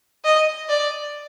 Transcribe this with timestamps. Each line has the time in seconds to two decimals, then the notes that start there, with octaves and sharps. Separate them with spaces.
0.25 D#5
0.69 D5